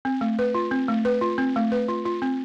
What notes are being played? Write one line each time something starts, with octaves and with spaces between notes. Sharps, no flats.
C4
A3
B4
F4
C4
A3
B4
F4
C4
A3
B4
F4
F4
C4